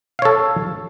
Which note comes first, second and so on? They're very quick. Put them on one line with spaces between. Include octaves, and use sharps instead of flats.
F5 C#5 A4